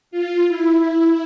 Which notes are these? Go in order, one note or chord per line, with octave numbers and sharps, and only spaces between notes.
F4
E4